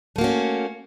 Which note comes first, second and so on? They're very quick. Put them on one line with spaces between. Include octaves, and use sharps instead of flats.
A3 A#3 F#4 C#4